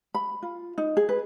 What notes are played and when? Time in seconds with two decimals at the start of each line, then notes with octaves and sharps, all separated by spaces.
0.15 B5
0.42 F4
0.78 D#4
0.97 G#4
1.09 B4